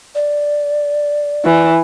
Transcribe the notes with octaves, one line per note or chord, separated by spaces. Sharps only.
D5
E3